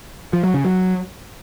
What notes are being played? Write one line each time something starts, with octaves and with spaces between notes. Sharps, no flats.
F3
F#3
C#3
F#3